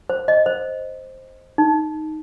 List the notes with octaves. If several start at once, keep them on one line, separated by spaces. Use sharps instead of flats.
C5
D#5
C5
D#4